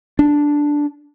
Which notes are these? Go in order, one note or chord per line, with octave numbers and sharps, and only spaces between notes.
D4